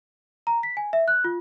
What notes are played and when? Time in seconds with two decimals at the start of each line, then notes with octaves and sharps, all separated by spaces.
0.47 A#5
0.63 B6
0.77 G#5
0.93 E5
1.08 F#6
1.24 F4